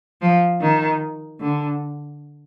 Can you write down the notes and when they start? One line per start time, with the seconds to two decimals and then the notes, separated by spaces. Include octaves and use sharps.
0.22 F3
0.61 D#3
1.40 D3